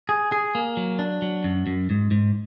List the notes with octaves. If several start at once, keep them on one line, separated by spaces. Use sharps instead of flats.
G#4
G#4
A#3
F#3
D4
F#3
F#2
F#2
G#2
G#2